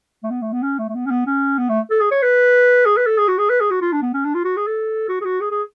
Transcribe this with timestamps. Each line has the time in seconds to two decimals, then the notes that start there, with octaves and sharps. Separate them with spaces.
0.23 A3
0.30 B3
0.42 A3
0.53 B3
0.63 C#4
0.79 A3
0.89 A3
0.95 B3
1.06 C#4
1.11 B3
1.26 C#4
1.59 B3
1.69 A3
1.91 A4
2.00 G#4
2.11 C#5
2.22 B4
2.86 G#4
2.97 B4
3.06 A4
3.18 G#4
3.28 F#4
3.38 G#4
3.50 B4
3.61 G#4
3.71 F#4
3.82 F4
3.92 D4
4.02 B3
4.14 C#4
4.24 D4
4.34 F4
4.44 F#4
4.57 G#4
4.67 A4
5.08 F#4
5.21 G#4
5.25 F#4
5.41 G#4
5.51 G#4